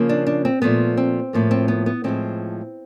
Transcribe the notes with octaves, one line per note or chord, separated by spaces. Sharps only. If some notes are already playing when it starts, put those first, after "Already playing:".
Already playing: C#3 F3 A#3
D4
D4
C4
A#2 F3 A3 B3
C4
A2 F3 A#3
C4
B3
B3
A2 F3 G#3 C4